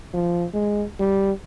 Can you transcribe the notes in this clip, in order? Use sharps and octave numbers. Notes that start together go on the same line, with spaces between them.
F3
G#3
G3